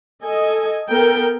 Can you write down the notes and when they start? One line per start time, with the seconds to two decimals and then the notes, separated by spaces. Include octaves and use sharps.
0.23 A4 D#5 G#5
0.89 B3 A4 A#4 G5